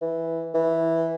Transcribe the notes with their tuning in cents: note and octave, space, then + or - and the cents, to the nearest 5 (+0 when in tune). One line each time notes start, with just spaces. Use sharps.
E3 -5
E3 -5